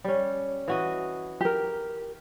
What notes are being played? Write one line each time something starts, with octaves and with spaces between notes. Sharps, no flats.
G3 C#4
E3 F#4 D#5
G4 A#4